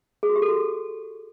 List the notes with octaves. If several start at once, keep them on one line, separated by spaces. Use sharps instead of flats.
G#4
F#4
G4
A4
F#4